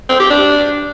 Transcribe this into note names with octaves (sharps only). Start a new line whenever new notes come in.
C4
G4
D4